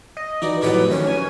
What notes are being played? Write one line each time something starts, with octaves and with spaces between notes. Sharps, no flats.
D#5
E3 D#4 F#4 D5
F2 A2 F#3 G4 B4
D#3 C#4
G#5